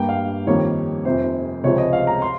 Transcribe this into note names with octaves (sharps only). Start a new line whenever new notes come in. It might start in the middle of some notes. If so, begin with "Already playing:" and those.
Already playing: G2 G3 A#3 G5
F5
F2 D#3 G3 A#3 C#5
F1 F2 C3 C5
C#2 C3 F3 G#3 C#5
D#5
F5
A#5
C6